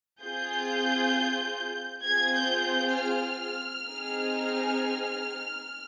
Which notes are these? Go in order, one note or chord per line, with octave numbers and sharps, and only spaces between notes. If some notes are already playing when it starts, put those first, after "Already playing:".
C4 F4 G#4 G6
C4 F4 G#4 G#6
G6
G6
F6
C4 D#4 G#4